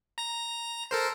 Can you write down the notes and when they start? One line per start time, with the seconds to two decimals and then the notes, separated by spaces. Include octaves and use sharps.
0.18 A#5 A#6
0.91 A4 A#4 C5